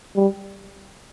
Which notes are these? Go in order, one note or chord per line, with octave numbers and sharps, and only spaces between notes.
G3